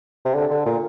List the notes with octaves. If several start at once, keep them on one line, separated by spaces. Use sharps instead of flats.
C3
D3
D3
A#2